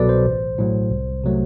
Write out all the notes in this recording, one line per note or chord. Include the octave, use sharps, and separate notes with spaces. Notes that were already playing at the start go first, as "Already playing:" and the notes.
Already playing: C2 B2 F#3 A4 B4 D5
C5
A1
A2 F#3
C2
C3 F#3 A3